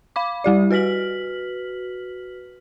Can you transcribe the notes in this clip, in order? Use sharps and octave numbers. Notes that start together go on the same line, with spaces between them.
F5 B5 D6
G3 G4 D5
F#4 B4 F6 B6 F#7